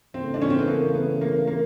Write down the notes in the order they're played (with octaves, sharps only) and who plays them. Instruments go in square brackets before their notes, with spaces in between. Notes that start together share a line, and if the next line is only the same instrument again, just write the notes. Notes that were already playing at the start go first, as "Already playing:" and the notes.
[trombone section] C#3 E3 A3 [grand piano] C4
[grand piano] D4
C#4
C4
B3
A#3
B3
A#3
A#3